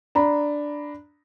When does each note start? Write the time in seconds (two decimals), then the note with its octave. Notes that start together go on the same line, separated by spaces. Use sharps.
0.15 D4 A#5 B5